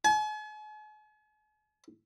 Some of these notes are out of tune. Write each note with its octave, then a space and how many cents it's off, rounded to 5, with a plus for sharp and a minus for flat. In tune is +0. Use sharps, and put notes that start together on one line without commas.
G#5 +45